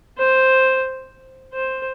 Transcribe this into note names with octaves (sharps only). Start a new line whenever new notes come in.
C5
C5